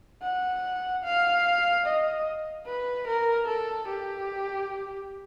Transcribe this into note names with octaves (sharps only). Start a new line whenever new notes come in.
F#5
F5
D#5
B4
A#4
A4
G4